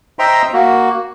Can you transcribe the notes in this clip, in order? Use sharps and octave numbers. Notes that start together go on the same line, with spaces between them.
C5 D#5 E5 G5 A#5 C6
A#3 F#4